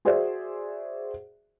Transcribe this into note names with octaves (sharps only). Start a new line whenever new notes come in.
F#4 G#4 C5 D5 E5